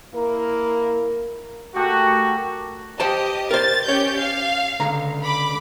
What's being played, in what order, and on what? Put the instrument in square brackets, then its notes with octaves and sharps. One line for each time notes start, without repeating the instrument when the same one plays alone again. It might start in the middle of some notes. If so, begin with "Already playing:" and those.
[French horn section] A#3 E4 A#4
[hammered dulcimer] A3 G4 A#4 [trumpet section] F#4
[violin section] G4 D#5 [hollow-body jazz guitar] C5 G5 A5
[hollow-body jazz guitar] A#4 C5 [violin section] A6
[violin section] C#4 G4 G6 [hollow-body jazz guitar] C#5
[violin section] F5
[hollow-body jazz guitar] C#2 D3 A#5
[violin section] B5 D6